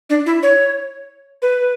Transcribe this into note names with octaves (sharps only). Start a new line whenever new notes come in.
D4
E4
C#5
B4